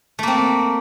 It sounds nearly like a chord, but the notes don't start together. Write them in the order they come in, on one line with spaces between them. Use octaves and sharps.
A3 A#3 C4